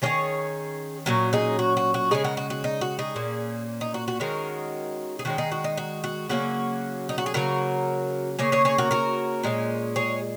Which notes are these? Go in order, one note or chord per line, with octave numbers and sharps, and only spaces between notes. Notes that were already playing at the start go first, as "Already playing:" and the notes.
D#3 A#3 C#4 G#4 C#5
A#2 F#3 C#4 F#4 A#4
D#4 G#4
F#4
F#4
F#4
C#3 G#3 C#4 D#4 G#4
F#4 A#4
F#4
F#4
D#4
F#4
D#4 G#4
A#2 A#3 C#4
D#4
F#4
F#4
D#3 G#3 C#4 F#4 A#4
G#4
D#3 G#3 C#4 F#4
D#4 G#4
F#4
D#4
F#4
F#4
C#3 F#3 A#3 C#4 F#4
D#4
F#4
G#4
C#3 F#3 A#3 F#4 A#4
C#3 A#3 C#4 G#4 C#5
G#4 C#5
G#4 C#5
F#4 A#4
F#4 A#4
A#2 G#3 C#4
G#4 C#5